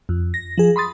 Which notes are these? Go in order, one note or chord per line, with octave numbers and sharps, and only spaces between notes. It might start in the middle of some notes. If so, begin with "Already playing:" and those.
F2
A#6
F3 G#4
B5 C6 D#6 A6